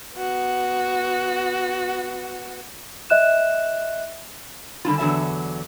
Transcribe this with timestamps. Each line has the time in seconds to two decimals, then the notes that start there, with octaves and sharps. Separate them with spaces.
0.17 B3 F#4
3.10 D#5 E5 F#6 E7
4.85 D3 G3 D4 F4
4.98 E2 D3 F#3 E5 A5